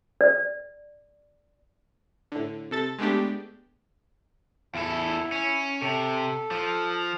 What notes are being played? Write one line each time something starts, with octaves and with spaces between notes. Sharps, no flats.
D5
A2 D3
C3 A4 A6
G#3 A3 B3 D4 G4
E2 E4 A4
C#4
C3 A4
F3